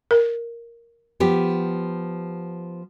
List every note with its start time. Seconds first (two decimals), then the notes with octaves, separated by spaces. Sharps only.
0.11 A#4
1.20 F3 B3 G4